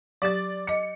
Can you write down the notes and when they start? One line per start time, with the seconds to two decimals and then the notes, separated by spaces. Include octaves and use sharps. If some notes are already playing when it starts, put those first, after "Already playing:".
0.22 F#3 G4 D5 A6
0.67 D#5 D6 C#7